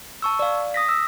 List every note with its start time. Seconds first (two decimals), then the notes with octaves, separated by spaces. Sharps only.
0.22 A5 C#6 E6
0.39 D5 F5
0.74 D#6 A#6 B6
0.89 E6